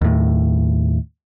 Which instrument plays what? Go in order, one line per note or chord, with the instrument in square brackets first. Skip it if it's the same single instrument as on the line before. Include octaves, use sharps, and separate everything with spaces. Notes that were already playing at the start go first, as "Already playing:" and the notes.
[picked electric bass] D#2 A2